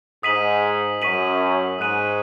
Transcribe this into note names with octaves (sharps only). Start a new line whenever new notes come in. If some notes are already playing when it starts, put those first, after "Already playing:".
G#2 D#6 B6 D#7 F#7
F#2 C#6 B6 D#7 F#7
G#2 D#6 F#6 D#7 F#7